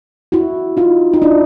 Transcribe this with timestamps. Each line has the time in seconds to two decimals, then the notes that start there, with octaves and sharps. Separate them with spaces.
0.32 E4 F#4
0.77 D#4 F4
1.14 D#4
1.22 D4 E4